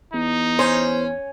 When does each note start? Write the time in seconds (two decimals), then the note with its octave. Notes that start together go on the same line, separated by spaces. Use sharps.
0.14 E2 D#4
0.59 C#4 C5